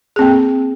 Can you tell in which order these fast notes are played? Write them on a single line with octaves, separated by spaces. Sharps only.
G#4 C4 A#3